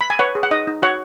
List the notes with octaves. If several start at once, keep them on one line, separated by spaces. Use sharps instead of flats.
B5
G#5
B4 C#5 F#5
G#4
F#5
D#4 D#5
D#4
F#4 C#5 F#5